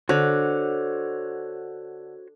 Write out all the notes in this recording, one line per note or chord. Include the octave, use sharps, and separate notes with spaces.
D3 F#4 C5 C#5